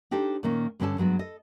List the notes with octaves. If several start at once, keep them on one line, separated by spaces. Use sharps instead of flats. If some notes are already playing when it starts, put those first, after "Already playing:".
D4 D#4 G4 A4 C5
A#2 D#3 A#3 C#4
G2 D3 C4 C#4 A4 A5
G2 F#3 G#3 B3
A4 D#5